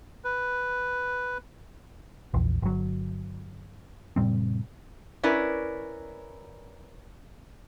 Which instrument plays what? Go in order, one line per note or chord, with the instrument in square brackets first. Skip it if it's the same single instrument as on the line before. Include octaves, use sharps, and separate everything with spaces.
[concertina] B4
[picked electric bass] A#1 E2
G1 F#3
F#1 A#2 G3 C4
[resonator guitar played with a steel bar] C#4 E4 A#4 B4 D5